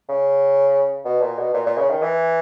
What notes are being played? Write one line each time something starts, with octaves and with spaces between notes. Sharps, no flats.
C#3
B2
A#2
B2
A#2
A#2
C#3
D#3
E3